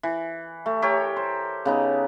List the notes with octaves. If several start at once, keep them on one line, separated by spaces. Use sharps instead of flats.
E3
A3
G4 A4 A#4 C#5
C5
C#3 B3 D#4